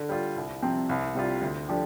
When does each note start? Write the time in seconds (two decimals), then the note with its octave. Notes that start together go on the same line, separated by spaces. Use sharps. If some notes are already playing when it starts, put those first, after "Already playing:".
Already playing: D3
0.09 G3 F4
0.36 C2
0.62 C3 F3 C4
0.89 C2
1.15 C3 G3 F4
1.41 D2
1.68 D3 F3 D4 G4